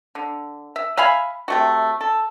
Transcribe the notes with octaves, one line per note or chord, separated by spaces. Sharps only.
D3
E5
E5 F5 G#5 B5
C3 A3 F#4
A4